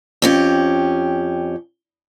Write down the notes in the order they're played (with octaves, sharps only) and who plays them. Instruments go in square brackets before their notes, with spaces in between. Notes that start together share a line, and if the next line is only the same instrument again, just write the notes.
[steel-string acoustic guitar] F2 C#4 G4